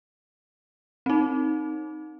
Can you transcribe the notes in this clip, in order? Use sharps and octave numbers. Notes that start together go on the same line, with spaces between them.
C4 D#4